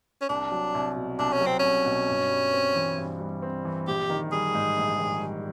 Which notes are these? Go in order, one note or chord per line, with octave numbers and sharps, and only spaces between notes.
C#4
C2 D4
F#3
C2
B2
C2 D4
C#4
F#3
C4
C2 C#4
B2
G2
G3
C4
E3
G2
G3
C4
E3
A#1 G4
D#3
G3 G#4
G#2
A#1
D#3
G3